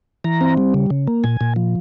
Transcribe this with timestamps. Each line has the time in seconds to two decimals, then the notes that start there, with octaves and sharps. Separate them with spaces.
0.24 E3 A#5
0.41 C4
0.57 G3
0.74 C#3
0.90 C#3
1.07 A#3
1.24 A#2 G#5
1.41 A#2
1.56 F3